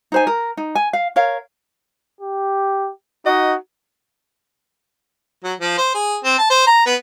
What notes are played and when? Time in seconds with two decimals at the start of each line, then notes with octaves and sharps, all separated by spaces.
0.12 D#4 C5 G#5
0.27 A#4
0.57 D#4
0.75 G#5
0.93 F5
1.16 A#4 C#5 F5
2.20 G4
3.26 D#4 F#4 D#5
5.44 F#3
5.60 F3
5.78 C5
5.94 G#4
6.24 C4
6.39 A5
6.50 C5
6.67 A#5
6.86 B3